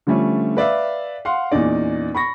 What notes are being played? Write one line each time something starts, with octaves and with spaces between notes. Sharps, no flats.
D3 F3 G3 A3 C#4
B4 D5 E5 F5
F5 F#5 C6
E2 A#2 C#4 D#4 D5
B5 C#6 A#6